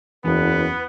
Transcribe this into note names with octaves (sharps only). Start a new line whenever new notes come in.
F#1 E2 B3 B4